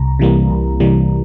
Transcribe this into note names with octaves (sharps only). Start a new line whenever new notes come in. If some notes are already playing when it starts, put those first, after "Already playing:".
Already playing: C2 A#5
C3 E3 G3 A#3
C2
C3 E3 G3 A#3